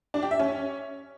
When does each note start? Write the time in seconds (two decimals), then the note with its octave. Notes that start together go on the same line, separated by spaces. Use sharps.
0.14 D4
0.23 G4
0.31 E5
0.39 C#4